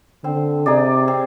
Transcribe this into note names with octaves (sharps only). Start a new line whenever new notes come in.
D3 C4
C3 D#4 G#4 D5
C4